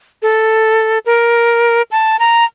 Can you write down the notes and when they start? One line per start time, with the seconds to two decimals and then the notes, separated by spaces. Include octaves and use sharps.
0.22 A4
1.06 A#4
1.91 A5
2.19 A#5